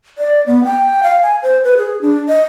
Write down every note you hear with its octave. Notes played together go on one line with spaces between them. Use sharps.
D5
B3
G5
F5
G#5
C5
B4
G#4
D4
D#5